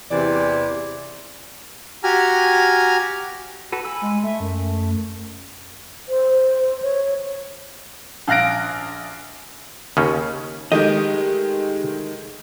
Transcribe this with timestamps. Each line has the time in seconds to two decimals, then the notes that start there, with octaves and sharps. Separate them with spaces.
0.10 E2 C3 E3 D5
2.04 F#4 G4 G#5 A#5 F6
3.72 F#4 A4 B4
3.85 G#5 B5 E6
4.01 G#3
4.23 A3 E5
4.40 F#2
6.09 C5
6.82 C#5
8.28 A#1 F5 F#6 A#6 D7
9.97 D#2 C#3 C#4
10.72 D#3 G#3 A3 G4 D#5